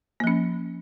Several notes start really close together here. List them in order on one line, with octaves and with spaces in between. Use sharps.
A#3 F3 C#4